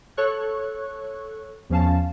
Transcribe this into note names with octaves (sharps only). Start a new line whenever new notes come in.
A4 C#5 C#6 F#6
E2 F3 C#4 F5 A5